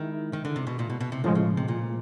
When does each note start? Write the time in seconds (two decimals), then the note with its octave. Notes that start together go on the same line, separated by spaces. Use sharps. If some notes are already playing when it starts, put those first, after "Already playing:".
Already playing: D#3 G#3 E4
0.33 D#3
0.45 D3
0.56 C3
0.67 B2
0.79 A#2
0.90 B2
1.00 B2
1.12 C3
1.24 A2 C#3 F3 G#3
1.35 C#3
1.57 C3
1.68 A#2